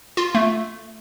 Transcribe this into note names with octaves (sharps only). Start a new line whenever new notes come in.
F4
A3